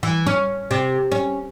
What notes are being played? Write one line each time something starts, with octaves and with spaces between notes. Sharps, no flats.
E3
C#4
C3
C#4